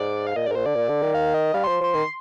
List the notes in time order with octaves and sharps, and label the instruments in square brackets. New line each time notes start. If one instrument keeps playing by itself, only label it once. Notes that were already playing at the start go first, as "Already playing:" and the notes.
Already playing: [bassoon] G#2 [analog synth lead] D5
[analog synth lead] F5
[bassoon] A#2 [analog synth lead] D#5
[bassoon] G#2 [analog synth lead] D5
[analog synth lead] A#4
[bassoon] A#2 [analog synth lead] C5
[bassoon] D3 [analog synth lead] D5
[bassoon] A#2
D3
D#3
[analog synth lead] F5
D#5
[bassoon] G3 [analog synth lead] F5
[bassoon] F3 [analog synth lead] C6
[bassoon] F3 [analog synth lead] C6
[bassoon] D#3 [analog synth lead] C6